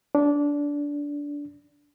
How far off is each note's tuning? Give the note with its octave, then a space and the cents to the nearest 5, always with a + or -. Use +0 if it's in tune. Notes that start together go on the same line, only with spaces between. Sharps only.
D4 -20